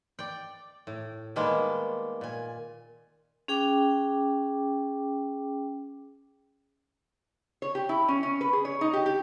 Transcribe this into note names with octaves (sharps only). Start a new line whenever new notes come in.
D5 G5
A2
D#3 G3 G#3 A#3 B3
A#2 G#5
C#4 G#4 G5 D6
C#5
G4
E4
C#4
C#4
B4
G#4
C#5
D#4
G4
G4